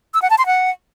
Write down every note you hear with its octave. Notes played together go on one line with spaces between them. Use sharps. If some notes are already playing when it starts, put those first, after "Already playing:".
E6
F#5
A5
C6
F#5